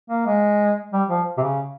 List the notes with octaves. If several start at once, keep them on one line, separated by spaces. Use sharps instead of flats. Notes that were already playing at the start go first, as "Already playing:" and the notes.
A#3
G#3
G3
F3
C3
C#3